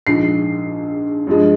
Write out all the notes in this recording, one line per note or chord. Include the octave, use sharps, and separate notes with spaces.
A#1 G#2 F3 C7
G2 F3 G#3